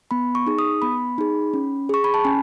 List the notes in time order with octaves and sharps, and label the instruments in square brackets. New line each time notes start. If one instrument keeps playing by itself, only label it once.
[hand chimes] B3 B5
C#6
D#4 G#4
D#6
B3 B5
D#4 G#4
C#4
G#4 C#6
B5
A5
C#4 G#5